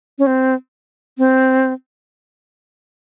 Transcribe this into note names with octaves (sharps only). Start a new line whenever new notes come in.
C#4
C4
C4